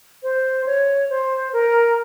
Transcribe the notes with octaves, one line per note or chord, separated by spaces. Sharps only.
C5
C#5
C5
A#4